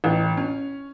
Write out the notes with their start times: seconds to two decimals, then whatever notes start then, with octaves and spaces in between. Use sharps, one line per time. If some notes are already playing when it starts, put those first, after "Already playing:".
0.04 A1
0.37 C#4